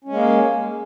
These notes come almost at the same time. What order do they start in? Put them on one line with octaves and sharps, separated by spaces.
C#4 G#3 A#3